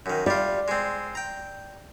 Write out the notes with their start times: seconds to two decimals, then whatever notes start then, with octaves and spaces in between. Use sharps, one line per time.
0.06 F#2 D#3
0.26 G3 F4 D5
0.68 G#3 C4
1.15 G5 A#5